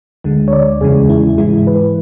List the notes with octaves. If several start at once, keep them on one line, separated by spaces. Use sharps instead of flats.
D2 D3 G#3
C#5
D5
E2 C#3 E3 G#3 G#4
E4
G#2 E3 G#3 E4
B4